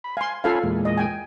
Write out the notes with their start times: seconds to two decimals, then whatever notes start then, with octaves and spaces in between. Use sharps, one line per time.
0.04 B5
0.17 F5 G#5 C6
0.44 C#4 F4 A4 F5 G#5 B5
0.63 E2 A#2 G#3
0.85 D#5
0.97 G5 G#5